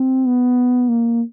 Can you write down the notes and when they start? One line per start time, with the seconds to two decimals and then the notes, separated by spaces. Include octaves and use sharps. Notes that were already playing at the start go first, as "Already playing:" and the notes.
Already playing: C4
0.27 B3
0.89 A#3